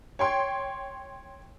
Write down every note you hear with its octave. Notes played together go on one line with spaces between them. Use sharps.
C#5 G5 C6